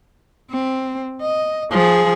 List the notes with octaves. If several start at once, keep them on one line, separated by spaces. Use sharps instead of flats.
C4
D#5
F3 G#4